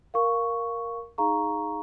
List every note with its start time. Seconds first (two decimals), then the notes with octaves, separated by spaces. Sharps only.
0.14 A#4 F5 C#6
1.18 D#4 G#4 F5 A#5 C#6